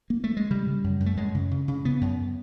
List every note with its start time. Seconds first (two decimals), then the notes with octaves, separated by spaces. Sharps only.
0.10 A#3
0.24 A3
0.37 G#3
0.50 C#3 G3
0.67 C#3
0.84 F#2
1.00 F#2
1.06 A3
1.17 F#2 G#3
1.35 C#3
1.51 C#3
1.68 C#3
1.85 C#3 B3
2.01 F#2